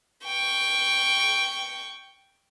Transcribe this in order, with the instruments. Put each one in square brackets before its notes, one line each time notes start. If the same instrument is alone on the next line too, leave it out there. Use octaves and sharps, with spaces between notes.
[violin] G5 C#6